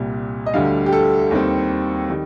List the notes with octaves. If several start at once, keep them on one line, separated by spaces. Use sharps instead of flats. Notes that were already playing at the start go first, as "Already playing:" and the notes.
Already playing: C2 A#2 G3
D#5
D2 D3 G3 F5
G4
A4
D#2 D#3 G3 C4
D#3 G3